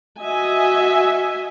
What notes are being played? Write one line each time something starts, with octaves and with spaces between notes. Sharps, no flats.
F#4 D#5 E5 G#5